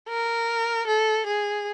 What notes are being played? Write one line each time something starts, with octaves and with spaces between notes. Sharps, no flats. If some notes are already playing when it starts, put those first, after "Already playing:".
A#4
A4
G#4